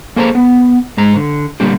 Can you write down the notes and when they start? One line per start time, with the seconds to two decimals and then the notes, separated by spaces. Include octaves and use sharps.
0.16 A#3 G#4 A4 C5 G#5 A#5
0.35 B3
0.97 G#2 G#3 A#5
1.16 D3
1.60 A#2 D3 G3 A#3 D4 G4